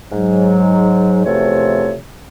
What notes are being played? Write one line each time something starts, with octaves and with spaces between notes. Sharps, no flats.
G#2 F#3
E2 C3 F3 A3 A4 C#5